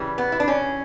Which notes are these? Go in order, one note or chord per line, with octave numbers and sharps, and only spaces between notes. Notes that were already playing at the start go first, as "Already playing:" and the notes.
Already playing: C#3 E3 G3
B3
E4
D4
C#4